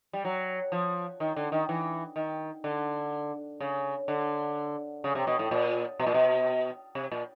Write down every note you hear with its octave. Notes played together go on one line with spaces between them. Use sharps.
G3
F#3
F3
D#3
D3
D#3
E3
D#3
D3
C#3
D3
C#3
C3
B2
A2
A#2
B2
A#2
B2
C3
A#2